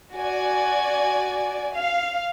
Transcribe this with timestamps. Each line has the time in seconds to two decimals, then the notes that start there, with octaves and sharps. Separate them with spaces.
0.14 F#4 D5 G#5
1.76 F5